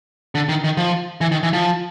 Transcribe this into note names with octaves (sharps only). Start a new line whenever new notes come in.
D3
D#3
D#3
F3
E3
D#3
E3
F3